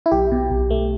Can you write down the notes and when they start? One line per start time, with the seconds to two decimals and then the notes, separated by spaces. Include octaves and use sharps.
0.06 E4
0.11 B1 G4
0.32 B2
0.50 B1
0.70 A3